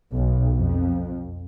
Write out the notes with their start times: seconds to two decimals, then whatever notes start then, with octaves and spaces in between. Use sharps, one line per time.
0.14 B1
0.58 F2